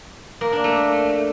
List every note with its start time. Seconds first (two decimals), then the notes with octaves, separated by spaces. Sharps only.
0.41 A#3
0.53 D4
0.64 A3